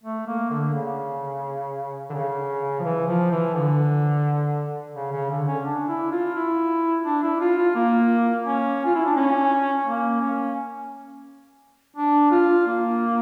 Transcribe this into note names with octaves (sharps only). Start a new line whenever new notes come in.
A3
A#3
D3
C#3
D3
C#3
F3
E3
F3
E3
D3
C#3
C#3
D3
C#4
D4
E4
F4
E4
D4
E4
F4
F4
A#3
C#4
F4
E4
D4
C#4
A#3
C#4
D4
F4
A#3